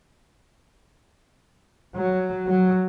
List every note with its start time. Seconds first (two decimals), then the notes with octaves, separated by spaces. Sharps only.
1.96 F#3
2.49 F#3